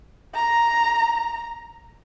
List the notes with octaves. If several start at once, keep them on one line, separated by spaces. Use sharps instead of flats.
A#5